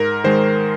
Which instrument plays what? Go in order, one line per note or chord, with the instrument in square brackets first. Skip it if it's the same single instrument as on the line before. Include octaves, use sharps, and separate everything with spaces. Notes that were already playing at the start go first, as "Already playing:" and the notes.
Already playing: [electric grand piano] G#2 A#4
D#3 G#3 C5